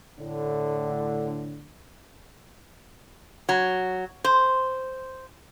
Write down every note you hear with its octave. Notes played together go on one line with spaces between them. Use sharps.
A2 D3
F#3
C5